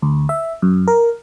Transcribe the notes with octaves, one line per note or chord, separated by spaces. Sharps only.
D2
E5
F#2
A#4